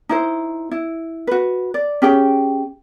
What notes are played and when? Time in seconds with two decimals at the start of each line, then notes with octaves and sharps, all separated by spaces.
0.09 D#4 E4 C5
0.71 E4
1.27 F#4 B4
1.74 D5
2.02 C#4 G4 G#4 G5